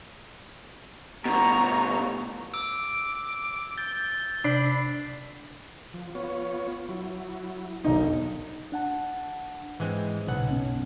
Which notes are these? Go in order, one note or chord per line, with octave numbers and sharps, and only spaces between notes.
G2 B2 A#5 C#6
D6 E6
G6 A6
C3 D4 D5 B5 C7
F3
B3 F4 C#5
F#3 E4
E1 B1 D#4
D4 F#5 A5
G#2 E3 G#3 C4
B1 A#2 C#3 F#5
F#2 B3 C#4